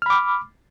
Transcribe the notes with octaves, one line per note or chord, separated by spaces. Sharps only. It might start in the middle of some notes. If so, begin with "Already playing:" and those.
B5 D6 F6